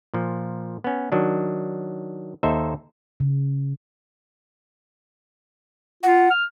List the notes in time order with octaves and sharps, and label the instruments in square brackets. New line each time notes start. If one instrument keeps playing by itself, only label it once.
[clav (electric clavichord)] A#2 F3
B3 C#4
D#3 F#3 D4
D#2 D#4 A4 C5 E5
[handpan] C#3
[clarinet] F4 [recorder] F#5
[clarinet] F6